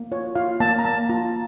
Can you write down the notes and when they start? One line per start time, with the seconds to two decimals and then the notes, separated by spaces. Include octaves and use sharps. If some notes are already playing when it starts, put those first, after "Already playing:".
Already playing: A#3
0.12 F4 C#5
0.35 F4 F5
0.60 A#3 A5
0.79 A#5
0.85 A#3 A5
1.09 F4 A#5